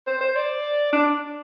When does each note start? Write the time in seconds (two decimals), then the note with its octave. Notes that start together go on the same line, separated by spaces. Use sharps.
0.07 C5
0.21 C5
0.36 D5
0.93 D4